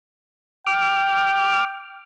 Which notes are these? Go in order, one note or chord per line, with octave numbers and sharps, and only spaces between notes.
G5 D6 F6